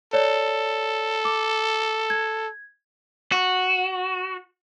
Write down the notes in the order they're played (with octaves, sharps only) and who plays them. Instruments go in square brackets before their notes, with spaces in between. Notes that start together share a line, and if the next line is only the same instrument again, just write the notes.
[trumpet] A4 [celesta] C#5 D5
[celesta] D6
G#6
[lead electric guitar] F#4